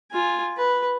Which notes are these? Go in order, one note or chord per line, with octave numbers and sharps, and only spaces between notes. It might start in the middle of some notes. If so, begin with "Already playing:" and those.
F4 G#5
B4